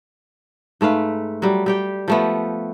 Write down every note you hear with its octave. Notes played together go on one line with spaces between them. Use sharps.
G#2 A3 B4 F5
F#3 G3
G3 G4 G5
F3 A3 B3